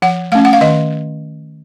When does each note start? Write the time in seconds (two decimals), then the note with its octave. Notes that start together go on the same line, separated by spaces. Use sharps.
0.02 F3 F#5
0.32 A3 C#4 F5
0.45 F#5
0.53 F5
0.61 D#3 D#5